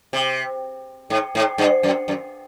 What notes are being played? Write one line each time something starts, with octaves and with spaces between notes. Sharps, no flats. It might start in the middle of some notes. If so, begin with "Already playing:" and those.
C3
G#2
G#2
G2
F#2
F#2